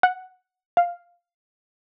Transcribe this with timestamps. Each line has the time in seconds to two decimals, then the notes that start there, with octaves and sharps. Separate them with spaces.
0.03 F#5
0.77 F5